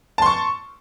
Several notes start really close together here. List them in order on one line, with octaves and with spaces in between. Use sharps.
A5 C6 C#6